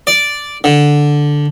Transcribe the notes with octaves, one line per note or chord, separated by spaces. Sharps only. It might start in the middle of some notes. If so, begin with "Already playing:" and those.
D5
D3